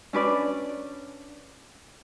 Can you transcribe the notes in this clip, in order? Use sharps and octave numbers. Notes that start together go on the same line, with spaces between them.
C#4 D4 B4 D5